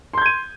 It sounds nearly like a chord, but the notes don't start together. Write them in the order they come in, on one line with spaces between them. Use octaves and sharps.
C6 G6 G#6 D#7